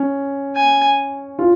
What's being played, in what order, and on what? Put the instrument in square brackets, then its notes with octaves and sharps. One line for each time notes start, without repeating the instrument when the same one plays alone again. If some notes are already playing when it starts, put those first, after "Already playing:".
Already playing: [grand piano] C#4
[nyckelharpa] G#5
[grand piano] F4